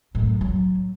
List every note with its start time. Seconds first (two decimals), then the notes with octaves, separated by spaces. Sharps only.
0.15 F#2 A2
0.41 F#3